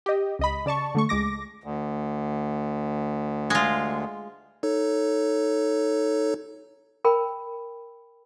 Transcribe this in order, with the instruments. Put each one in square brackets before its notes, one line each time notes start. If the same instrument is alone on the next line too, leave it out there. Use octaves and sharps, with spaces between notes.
[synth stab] G4 D#5
C#2 D#5 B5
C#3 D5 A5 C#6
D3 A3 C#6
C#2 G#3 D6 A#6
[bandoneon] D2
[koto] G#3 F4
[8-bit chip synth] D#4 A4 C#5
[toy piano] A#4 G5 B5